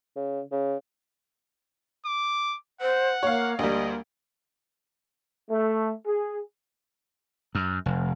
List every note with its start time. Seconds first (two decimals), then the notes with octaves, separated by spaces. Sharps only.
0.16 C#3
0.52 C#3
2.06 D6
2.81 C5 F#5
3.23 A#3 C#5 F5
3.59 D2 G3 A#3 D#5
5.50 A3
6.06 G#4
7.55 F#2
7.86 F1